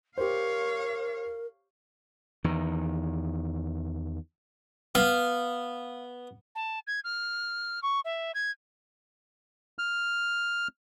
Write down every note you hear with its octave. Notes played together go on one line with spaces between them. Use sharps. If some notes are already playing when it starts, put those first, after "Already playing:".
G4 A#4 C5 C#5 F5
E2 D#3
B3 F5
A5
G#6
F6
C#6
E5
G#6
F6